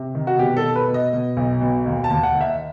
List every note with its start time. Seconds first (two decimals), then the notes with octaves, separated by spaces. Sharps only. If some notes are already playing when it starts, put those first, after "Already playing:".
Already playing: C3
0.15 D#3
0.27 F#4
0.38 B2 G4
0.57 A4
0.63 B2
0.76 B4
0.88 B2
0.94 D#5
1.13 B2
1.37 B1
1.61 B2
1.86 D#2
2.04 A5
2.10 D#2
2.23 F#5
2.35 D#3
2.41 E5